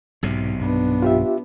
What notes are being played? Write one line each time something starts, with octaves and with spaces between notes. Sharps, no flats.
B1 G#2 C3
G2 B3 D4
F4 G4 E5